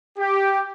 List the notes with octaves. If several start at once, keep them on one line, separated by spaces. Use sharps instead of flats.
G4